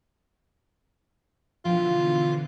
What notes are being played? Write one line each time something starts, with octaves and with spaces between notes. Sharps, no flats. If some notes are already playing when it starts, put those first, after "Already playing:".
B2 D3 E3 F3 F4 G5